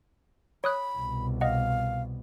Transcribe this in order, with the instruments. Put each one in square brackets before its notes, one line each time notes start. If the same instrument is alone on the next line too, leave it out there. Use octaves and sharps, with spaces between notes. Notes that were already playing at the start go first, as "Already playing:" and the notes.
[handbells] C#5 D#6 F#6 [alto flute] B5
[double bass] C2 B2
[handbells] D#5 F#5 [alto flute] F5